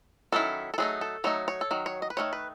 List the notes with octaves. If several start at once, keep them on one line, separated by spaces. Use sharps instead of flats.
D#3 F#3 C#4 E4 A4
A4
F#3 A3 D#4 G#4
A4
F#3 A3 D#4 C#5
C#5
A4
D#3 F#3
C#5
D#5
B4
D#3 F#3 A3 C#5
B4